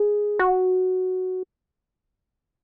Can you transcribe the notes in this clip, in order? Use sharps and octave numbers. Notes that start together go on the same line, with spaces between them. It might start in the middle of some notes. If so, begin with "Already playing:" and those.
Already playing: G#4
F#4